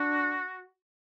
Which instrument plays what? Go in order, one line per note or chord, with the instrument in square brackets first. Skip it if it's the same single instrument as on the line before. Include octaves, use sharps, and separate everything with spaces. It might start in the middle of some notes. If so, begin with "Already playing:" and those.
Already playing: [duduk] D4 [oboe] F#4